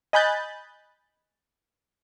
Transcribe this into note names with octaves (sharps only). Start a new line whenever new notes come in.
D#5 G#5 B5 F#6 G6 A6